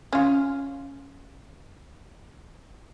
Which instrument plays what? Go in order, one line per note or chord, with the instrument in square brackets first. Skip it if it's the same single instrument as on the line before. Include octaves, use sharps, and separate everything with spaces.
[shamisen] C#4 F4